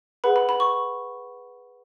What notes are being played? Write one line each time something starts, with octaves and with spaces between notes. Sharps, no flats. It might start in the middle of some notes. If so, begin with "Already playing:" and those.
G#4 B4 F#5 B5
B5
B5
C#6